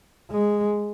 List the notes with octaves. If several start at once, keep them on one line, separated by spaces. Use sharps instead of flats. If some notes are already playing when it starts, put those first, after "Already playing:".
G#3